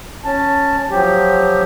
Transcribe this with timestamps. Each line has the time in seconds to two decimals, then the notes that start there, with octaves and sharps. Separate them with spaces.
0.24 C#4 A5
0.91 F3 F#3 G4